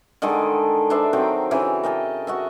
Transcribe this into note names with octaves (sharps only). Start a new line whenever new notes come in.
D3 D#3 G#3 A4
D4 B4 C5 E5
D#3 F#3 C4 G5
C#3 E3
A#4 D#5 G5 A5
F#4 D#5 E5